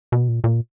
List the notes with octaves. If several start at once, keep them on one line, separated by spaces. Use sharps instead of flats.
B2
A#2
A#2